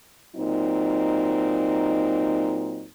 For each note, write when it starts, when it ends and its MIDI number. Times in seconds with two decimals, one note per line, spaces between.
0.36 2.85 46
0.36 2.85 54
0.36 2.85 60
0.36 2.85 63